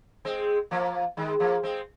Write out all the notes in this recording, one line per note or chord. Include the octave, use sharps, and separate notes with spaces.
G#3 C4
F3 A#3
D#3 G#3
F3 A#3
G#3 C4